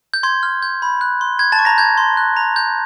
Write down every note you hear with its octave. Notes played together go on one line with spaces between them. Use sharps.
G6
C6 G#6
F6
G6
B5
F#6
C6
G6 G#6
A5 A6
C#6
A#5 A#6
G6 G#6
C6
F#6
A#5
G6